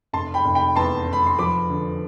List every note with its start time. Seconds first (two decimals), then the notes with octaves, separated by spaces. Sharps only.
0.13 F1 A5 C6
0.34 G5 B5
0.45 F1
0.55 G5 B5
0.76 E2 A5 C6
1.08 F1 B5
1.26 C6
1.39 F3 B5 D6
1.70 D3